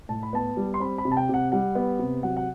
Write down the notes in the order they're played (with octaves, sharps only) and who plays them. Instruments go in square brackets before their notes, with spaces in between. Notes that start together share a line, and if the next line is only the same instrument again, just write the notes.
[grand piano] A2 A5
B5
B3 A5
G3
C6
C4 B5
B5
C3
A5
G5
C3 F#5
G3 F#5
B3
C3
F#3 F#5
F#5